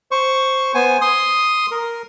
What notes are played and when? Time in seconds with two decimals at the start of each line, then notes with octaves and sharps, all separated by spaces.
0.11 C5 C#6
0.75 B3 C5 G#5
1.01 C6 D#6
1.71 A#4